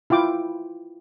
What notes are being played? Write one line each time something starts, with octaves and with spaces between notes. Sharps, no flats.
E4 F4 G5 D6